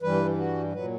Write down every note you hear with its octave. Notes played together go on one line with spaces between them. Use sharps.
G2 E3 G3 B4
F#4
A#2 F#3 B4